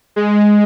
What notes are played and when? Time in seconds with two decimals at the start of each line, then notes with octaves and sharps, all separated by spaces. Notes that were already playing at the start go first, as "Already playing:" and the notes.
0.16 G#3